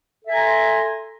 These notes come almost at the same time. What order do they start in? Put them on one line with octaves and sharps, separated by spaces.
A4 E5 G#5 A#5 C6